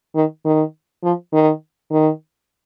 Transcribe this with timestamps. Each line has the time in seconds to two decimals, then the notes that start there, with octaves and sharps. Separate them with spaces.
0.15 D#3
0.45 D#3
1.03 F3
1.33 D#3
1.91 D#3